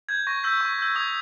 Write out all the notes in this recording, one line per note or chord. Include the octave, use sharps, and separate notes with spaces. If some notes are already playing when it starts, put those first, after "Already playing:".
G6 G#6
C#6 A#6
E6 G6 B6
C#6
E6 G6
D#6 G#6